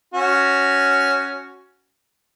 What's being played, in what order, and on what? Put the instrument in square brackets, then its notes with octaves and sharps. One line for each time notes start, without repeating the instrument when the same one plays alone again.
[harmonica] C#4 F#4